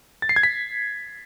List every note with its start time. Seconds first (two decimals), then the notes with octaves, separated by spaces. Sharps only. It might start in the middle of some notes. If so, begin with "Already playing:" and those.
0.22 A6
0.29 C7
0.36 G#6
0.43 B6